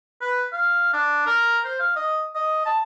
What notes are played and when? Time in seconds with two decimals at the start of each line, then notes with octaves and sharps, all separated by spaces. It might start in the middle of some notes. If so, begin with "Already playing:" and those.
0.21 B4
0.52 F5
0.93 D4
1.26 A#4
1.64 C5
1.80 F5
1.96 D#5
2.35 D#5
2.66 A5